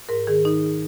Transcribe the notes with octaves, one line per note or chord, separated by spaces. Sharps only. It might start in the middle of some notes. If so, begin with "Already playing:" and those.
G#2 A#4
D#3 G#4
D#3 D#4